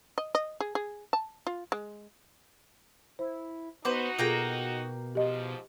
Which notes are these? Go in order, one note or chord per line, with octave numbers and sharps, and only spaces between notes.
D#5
D#5
G#4
G#4
A5
F4
G#3
E4 C5
B3 D#4 F#4 B4 C5 F#5 D6
B2 A#3 F4 G#4 A4 G5 A#5
G#2 F3 G4 D#5